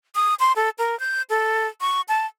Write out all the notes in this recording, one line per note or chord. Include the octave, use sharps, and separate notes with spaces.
D#6
C6
A4
A#4
G6
A4
C#6
A5